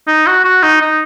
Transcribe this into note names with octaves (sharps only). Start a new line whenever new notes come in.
D#4
F#4
F#4
D#4
D#4